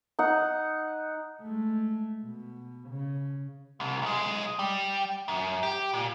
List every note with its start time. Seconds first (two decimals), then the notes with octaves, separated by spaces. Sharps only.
0.19 D#4 F#5
1.42 G#3 A3
2.23 B2
2.89 C#3
3.80 C2
4.02 B1 G#3
4.59 G3
5.28 F#2
5.63 G4
5.94 A#2